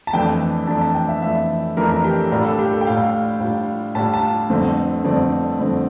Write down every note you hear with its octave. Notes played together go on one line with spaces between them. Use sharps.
A5
F2 E3 A3 D4 G5
F2 E3 A3 D4 A5
A5
G5
E5
F2 E3 A3 D4 E5
F2 E3 A3 D4 A#4
A#4
G4
A4
A2 G3 D4 F4 A#4
A4
G4
A4
G5
A2 G3 D4 F4 F5
A2 G3 D4 F4
A2 G3 D4 F4 A5
A5
G1 F2 D3 A3 C4
G1 F2 D3 A3 C4 D5
G1 F2 D3 A3 C4